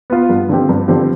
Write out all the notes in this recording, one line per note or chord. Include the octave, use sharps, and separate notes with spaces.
B3 F4
G2
D3 F3 C4 G4
G2
D3 F3 C4 G4